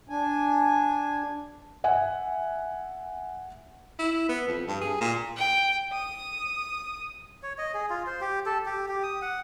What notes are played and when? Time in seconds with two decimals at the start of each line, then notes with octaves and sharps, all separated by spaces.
0.09 D4 G#5
1.84 E5 F#5 G#5
3.99 E4
4.29 B3
4.48 F2
4.68 G2
4.81 G#4
5.01 A#2
5.36 G5
5.93 D#6
7.43 C#5
7.58 D#5
7.74 G#4
7.90 F4
8.07 C5
8.21 G4
8.46 A4
8.66 G4
8.89 G4
9.03 D#6
9.22 F#5